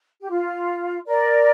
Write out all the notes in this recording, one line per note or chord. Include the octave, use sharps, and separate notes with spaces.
G4
F4
A#4 D5